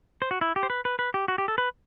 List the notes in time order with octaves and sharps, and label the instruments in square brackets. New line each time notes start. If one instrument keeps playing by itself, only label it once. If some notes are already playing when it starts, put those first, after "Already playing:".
[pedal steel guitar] C5
F#4
E4
G4
C5
B4
B4
B4
G4
F#4
G4
A4
B4